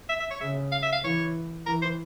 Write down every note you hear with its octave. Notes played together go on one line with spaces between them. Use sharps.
E5
E5
C#5
C#3 E5
F5
E5
F5
E3 C#5
E3 A#4
C5